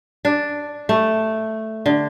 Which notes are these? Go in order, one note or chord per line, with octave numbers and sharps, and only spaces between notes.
D4
A3
D3